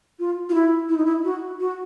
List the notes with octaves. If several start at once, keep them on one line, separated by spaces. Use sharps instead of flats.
F4
F4
E4
E4
D#4
E4
F#4
F#4